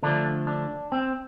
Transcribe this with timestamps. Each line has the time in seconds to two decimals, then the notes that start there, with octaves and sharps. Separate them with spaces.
0.03 D3 F3 A3 D4
0.47 D4
0.92 C4